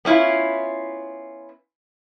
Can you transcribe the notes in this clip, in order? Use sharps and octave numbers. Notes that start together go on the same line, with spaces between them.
B3 C#4 E4 F4